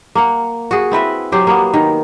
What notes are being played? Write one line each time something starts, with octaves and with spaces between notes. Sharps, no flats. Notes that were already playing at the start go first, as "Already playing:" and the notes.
A#3 F#5
F#4 G#4
C4 E4 B4 E5
F#3 G4 C5
A#3 B3
D#3